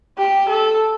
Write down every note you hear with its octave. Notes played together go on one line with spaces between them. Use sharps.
G4
A4